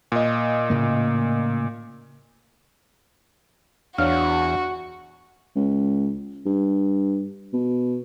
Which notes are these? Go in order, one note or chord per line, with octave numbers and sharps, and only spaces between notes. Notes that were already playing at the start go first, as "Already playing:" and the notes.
A#2 D#5
A2 C#3 A#3
E2 D4 F#4 C#5 F5 F6
C#2
G2
B2